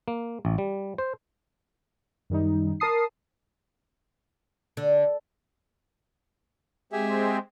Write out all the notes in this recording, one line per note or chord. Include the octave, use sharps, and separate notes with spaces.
A#3
A1
G3
C5
F#2 D#3 G3 D#4
A#4 A5 D#6 C7
D3
G#3 C4 G4 G#4 E5